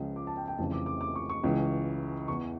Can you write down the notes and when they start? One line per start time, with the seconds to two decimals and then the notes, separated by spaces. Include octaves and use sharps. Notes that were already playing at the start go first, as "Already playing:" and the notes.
Already playing: C#2 C#3 F3
0.16 D6
0.27 A5
0.37 G5
0.48 G5
0.58 F1 F2 C#3 E3 A5
0.72 D6
0.86 D6
1.01 D6
1.16 C#6
1.30 C#6
1.43 C#2 C#3 E3
2.28 E2 E3 C#6